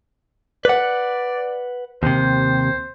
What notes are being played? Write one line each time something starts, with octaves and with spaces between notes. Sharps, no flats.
B4 D5 F#5
D#2 C3 C5